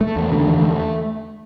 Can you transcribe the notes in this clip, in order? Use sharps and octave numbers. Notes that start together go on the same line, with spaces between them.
A3
E2
D3
E2
A3